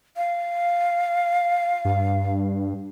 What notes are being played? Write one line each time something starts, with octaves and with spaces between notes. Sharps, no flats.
F5
G2